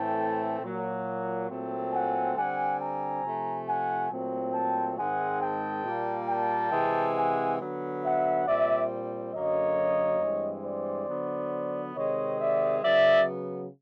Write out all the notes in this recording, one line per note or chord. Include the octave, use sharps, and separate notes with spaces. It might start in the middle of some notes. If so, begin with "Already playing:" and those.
Already playing: A2 E3 A3 C4 G5 A5
A#2 F#3 A#3
A#2 F#3 A3 C4
F#5 G#5
D3 G3 C4 F#5 G#5
G#5 A#5
C3 F3 A3
F#5 G#5
A#2 F#3 A3 C4
G5 A5
G#2 D#3 G#3 C4 F#5 G#5
G5 A5
A#2 G3 A#3
G5 A5
C3 E3 G#3 C4
F#5 G#5
D3 F#3 B3
E5 F#5
A#2 G3 C4 D5 E5
F#2 D3 F#3 A#3 C#5 D#5
G2 E3 G#3 C4
C5 D5
D3 F#3 B3
C3 D#3 G#3 C4 C#5 D#5
D5 E5
C#3 F#3 B3 D5 E5